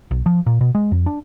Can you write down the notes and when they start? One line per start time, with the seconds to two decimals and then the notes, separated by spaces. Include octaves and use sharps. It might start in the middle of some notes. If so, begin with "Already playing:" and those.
0.11 B1
0.26 F3
0.46 A#2
0.61 B2
0.75 G#3
0.92 F2
1.06 D4